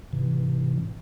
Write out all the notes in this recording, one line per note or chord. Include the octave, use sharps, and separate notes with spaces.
G#2 C3 E3